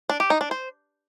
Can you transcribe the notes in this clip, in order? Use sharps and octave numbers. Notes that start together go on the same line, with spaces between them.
D4
G4
D#4
D4
C5